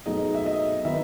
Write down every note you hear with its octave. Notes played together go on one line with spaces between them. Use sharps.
B2 F#3 A3 D#4 G#4 D#5
E5
D#5
D#3 F#3 B3 D#4 E5